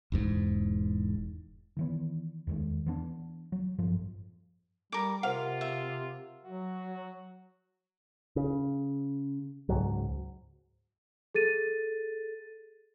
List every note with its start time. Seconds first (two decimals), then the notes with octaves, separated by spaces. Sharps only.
0.12 E1 E2 G#2
1.77 D#3 E3 B3
2.47 E2 D#3 G#3
2.86 E3 B3 D4
3.52 F#3
3.78 A1 G2 F3
4.92 G3 A#4 D6
5.23 C3 F4 A#4 C5 F5 F#5
5.61 E5
6.45 F#3 F#4
8.36 C#3
9.69 C#2 G#2 F#3
11.35 G#4 A4 A6 D#7